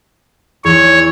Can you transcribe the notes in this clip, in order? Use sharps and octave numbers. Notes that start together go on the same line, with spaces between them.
E2 C#5